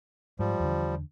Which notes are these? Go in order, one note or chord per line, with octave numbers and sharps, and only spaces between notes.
G#2 F3 G3
E2 D3